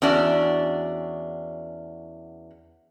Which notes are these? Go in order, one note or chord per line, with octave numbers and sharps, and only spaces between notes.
E2 C#4 D4 F#4 D5